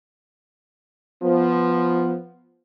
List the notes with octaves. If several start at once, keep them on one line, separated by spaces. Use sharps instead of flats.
F3 B3